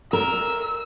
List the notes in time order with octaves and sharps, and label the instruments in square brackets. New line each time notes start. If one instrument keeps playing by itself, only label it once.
[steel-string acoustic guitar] A#4 [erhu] E6